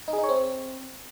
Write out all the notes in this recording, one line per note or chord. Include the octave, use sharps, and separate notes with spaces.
D#4
G#4
D#4
C#5
C4